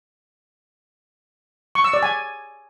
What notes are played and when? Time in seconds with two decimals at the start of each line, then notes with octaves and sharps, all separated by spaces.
1.75 C#6
1.84 E6
1.94 D5
2.03 G#5